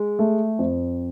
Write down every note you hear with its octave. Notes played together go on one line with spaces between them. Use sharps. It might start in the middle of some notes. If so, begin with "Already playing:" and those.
Already playing: G#3
A3
F2